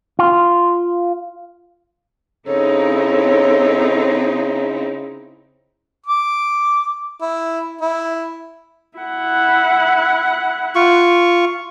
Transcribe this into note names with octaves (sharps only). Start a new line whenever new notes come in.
F4
C#3 C4 D#4 E4 A4 C#5
D6
E4
E4
E4 F#5
F4 C#6